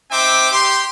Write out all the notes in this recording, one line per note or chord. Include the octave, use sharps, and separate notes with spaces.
C4 D#4 C5 E5 G5 D6
G4 C6